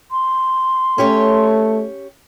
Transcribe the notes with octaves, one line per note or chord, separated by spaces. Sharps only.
C6
A3 C#4 G4 C#5